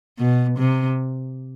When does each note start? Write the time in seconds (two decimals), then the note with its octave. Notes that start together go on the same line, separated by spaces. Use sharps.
0.18 B2
0.58 C3